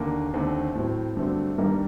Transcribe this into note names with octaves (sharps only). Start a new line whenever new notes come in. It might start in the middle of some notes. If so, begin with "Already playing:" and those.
Already playing: D#2 D3 A#3
D#2 D3 A3 C4 C5
A2 F#3 C4
G2 D3 F#3 A3 C4
G2 D#3 G3 A#3